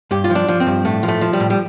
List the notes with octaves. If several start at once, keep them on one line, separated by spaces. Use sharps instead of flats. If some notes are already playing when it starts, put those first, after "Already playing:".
G2 G4
F4
F3
D4
F3
C4
G2
A2 A3
F3
A3
F3
G3
A2
G3